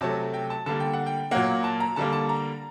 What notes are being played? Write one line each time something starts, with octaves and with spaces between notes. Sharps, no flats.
C3 F#3 A3 A5
G5
A5
D3 G3 A#3 A5
G5
F#5
G5
A#2 F#3 A#3 F#5
A5
A#5
D3 G3 A#3 A5
A5
A#5